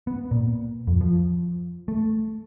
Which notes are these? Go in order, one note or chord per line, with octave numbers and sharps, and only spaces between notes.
B3
A#2
F2
F3
A3